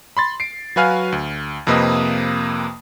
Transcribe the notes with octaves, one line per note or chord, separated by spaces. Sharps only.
B5 C6 A6
C7 D7
F#3 F#4 B4 F5 G#5 F6
D2
F2 C3 A#3 B4 D#5 D#6